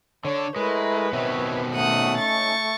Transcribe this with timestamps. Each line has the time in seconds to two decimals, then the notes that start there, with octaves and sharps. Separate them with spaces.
0.25 D3 D4 C#5
0.56 G#3 A3 E4 A#4 B4
1.13 B2 D#3 C4 C#5 E5
1.74 A3 C#4 D#4 F#5 D#6
2.18 C#6 A6